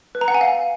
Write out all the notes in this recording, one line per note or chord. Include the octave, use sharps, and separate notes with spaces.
B4
A#5
F#5
G#5
F5